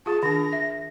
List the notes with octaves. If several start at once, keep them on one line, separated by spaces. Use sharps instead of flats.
F4 G#4 A5
D#3 D4 A#6
E5